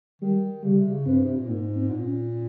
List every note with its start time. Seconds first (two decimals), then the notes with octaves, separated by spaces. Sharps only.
0.22 D#3 G3
0.64 C#3 G3
0.78 C3
0.92 C#3
1.06 G2 C4
1.24 C3
1.36 A#2
1.49 G#2 A#3
1.76 C4
1.90 A#2
2.05 C#4